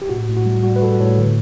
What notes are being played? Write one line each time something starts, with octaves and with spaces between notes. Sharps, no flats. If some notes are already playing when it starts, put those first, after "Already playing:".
G4
A2 F#4
A2
F#4
G3
G3 F#4
B4
G3 F#4 A4
A2 A4 C#5
D3